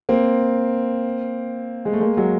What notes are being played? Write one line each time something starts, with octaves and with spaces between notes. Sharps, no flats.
A#3 C4
G#3
A3
G#3 A#3
F#3 G#3